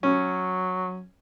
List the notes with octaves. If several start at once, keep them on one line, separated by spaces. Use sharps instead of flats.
F#3 C#4